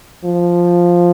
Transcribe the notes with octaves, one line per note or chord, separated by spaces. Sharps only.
F3